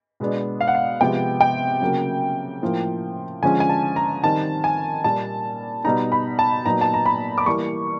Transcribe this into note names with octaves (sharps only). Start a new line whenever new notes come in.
B2 G#3 B3 D4
F5
F#5
F5
C3 F3 G#3 B3 G5
G5
C#3 F#3 A#3
A2 F3 A#3
D3 F3 G#3 C#4 G#5
G#5
A5
A#5
D#3 G3 C4 D#4 A5
G#5
A#2 G3 A#3 A5
B2 G3 B3 D#4 A#5
B5
A5
A#2 F#3 B3 D#4 A#5
A5
A#5
B5
D6
E3 G3 A#3 C#6